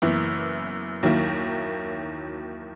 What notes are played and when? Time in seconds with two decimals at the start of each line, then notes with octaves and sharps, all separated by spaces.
0.02 F#1 F#2 E3 B3 E4
1.03 D#2 D#3 F#3 A#3 E4